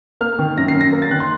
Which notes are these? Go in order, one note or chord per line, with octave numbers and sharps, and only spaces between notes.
A#3 F6
D#3
F#2 A#6
C7
F#2
A#6
A#3
A6
D#3 F#6
C6